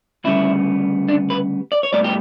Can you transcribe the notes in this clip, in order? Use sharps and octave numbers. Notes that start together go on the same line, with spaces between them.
D2 C#3 G3 B3 E4
D4
B4
D5
C#5
A2 G3 B3 D5
G4